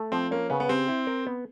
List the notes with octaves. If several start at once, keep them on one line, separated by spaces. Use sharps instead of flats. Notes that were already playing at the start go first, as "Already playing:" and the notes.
Already playing: A3
F3 C4
A#3 C#4
C#3 B3
B3
C4 G4
E4
A#4
B3